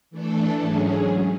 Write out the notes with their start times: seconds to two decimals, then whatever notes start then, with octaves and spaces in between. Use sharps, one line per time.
0.11 E3 A3 D4 A4
0.60 G#2 F#3 C#4 G#4